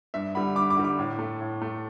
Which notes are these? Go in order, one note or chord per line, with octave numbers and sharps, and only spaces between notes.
G2 E5
D3 G3 B5
G2 D6
D6
D3 G3
D6
A2
A3
A2
A3